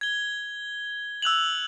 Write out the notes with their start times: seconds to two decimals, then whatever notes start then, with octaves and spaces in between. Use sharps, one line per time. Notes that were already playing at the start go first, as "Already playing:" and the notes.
0.01 G#6 G7
1.22 E6 F#6 F7 F#7